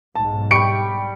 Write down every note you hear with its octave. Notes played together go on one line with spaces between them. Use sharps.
B1 G#2 A5
G3 G5 C#6 C#7 D7